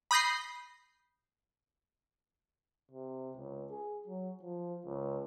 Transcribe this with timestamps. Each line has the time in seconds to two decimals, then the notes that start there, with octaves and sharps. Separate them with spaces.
0.11 B5 D#6 G6 A#6 C7
2.92 C3
3.36 C#2
3.70 G#4
4.08 F#3
4.42 F3
4.86 C#2